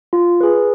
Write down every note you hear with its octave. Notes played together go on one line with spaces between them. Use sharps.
F4
G#4 B4